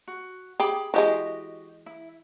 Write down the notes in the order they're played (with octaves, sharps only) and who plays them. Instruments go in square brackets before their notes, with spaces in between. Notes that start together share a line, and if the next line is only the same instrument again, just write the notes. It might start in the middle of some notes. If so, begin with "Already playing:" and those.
[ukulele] F#4
[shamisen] G4 [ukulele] G#4 B5
[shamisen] E3 F3 G#3 [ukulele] F#4 G4 D#5
[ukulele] E4